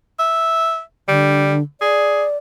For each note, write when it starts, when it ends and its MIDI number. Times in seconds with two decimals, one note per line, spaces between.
0.19 0.80 76
1.08 1.63 50
1.08 1.55 55
1.81 2.25 68
1.81 2.37 74